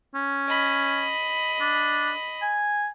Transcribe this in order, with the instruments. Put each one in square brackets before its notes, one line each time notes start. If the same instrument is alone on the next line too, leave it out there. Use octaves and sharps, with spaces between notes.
[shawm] C#4
[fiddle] D#5 B5
[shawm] D4
G#5